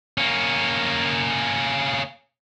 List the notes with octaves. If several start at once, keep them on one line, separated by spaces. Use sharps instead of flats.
A#3 C#4